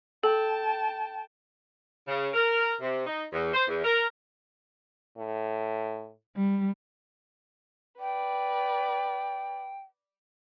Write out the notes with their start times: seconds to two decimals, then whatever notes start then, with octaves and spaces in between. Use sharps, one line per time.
0.23 A4 G5 A5
2.08 C#3
2.33 A#4
2.81 C3
3.06 D#4
3.32 E2
3.54 C5
3.67 E2
3.84 A#4
5.17 A2
6.36 G3
7.99 B4 D5 G5